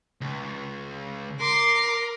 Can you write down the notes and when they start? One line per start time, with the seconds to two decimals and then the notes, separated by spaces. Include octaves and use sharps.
0.21 C#2
1.40 A#4 C6 D6